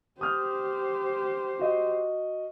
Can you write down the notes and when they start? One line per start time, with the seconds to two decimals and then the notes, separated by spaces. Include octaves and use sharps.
0.21 G4 C5 D#6 F6 G6
1.59 F#4 D#5